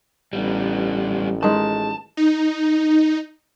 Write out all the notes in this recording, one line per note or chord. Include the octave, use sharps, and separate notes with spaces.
A1 G3 B3
D#3 G#3 A5
D#4